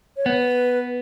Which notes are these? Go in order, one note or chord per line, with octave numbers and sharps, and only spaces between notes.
C#5
B3 B4